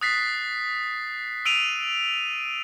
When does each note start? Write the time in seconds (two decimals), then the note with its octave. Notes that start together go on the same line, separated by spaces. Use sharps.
0.01 D#6 F#6 A6 B6 C7
1.45 E6 D7 D#7 F7